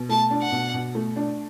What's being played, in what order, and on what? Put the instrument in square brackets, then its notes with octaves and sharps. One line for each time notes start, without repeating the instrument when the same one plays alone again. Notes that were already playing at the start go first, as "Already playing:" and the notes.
Already playing: [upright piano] B2
[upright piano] A3 [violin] A5
[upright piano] D4
[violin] F#5
[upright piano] B2
B2
A3
D4